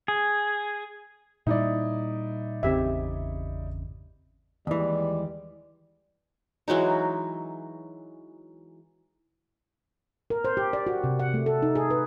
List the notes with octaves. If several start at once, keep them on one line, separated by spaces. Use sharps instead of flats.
G#4
A#2 G3 D#4 E4 D5
G#1 E2 C#3 C4 G4 E5
D#2 E3 G3 G#3 D5
E3 F#3 G#3 D#4
A#4
C5
G4
D5
F#4
C3
F#5
A3
A4
D#4
G#4
B4